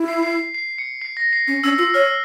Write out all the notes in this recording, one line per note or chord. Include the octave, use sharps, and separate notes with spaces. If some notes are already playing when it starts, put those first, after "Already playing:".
Already playing: E4
C7
C7
C7
C7
C#7
C7
A#6
C7
C#4
C#4 E6
F4 E6
C#5 F6